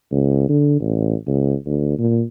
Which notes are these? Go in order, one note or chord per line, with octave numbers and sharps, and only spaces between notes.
C#2
D3
A1
C#2
D2
A#2